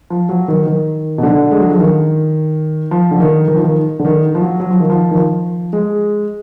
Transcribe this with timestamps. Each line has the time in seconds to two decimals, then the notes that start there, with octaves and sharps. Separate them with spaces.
0.10 F3
0.29 F#3
0.48 D#3
0.66 D#3
1.18 B2
1.23 D3
1.51 G#3
1.60 F#3
1.70 F3
1.79 D#3
2.91 F3
3.11 D3
3.20 D#3
3.48 D#3
3.55 F3
3.64 D#3
3.99 D3
4.05 D#3
4.35 F3
4.41 F#3
4.60 F#3
4.71 F3
4.80 D#3
4.90 F3
5.11 D#3
5.17 F3
5.73 G#3